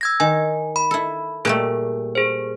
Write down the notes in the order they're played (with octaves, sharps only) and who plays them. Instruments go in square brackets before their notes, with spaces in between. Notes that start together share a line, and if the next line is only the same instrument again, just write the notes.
[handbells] E6 G#6 A#6
[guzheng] D#3 [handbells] G#5
[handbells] B5
[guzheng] E4 A4
[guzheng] A#2 G3 A3 [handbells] G#4
[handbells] G#4 C5